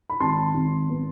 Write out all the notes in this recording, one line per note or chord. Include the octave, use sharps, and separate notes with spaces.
B5
G#1 A5 C6
G#1
B3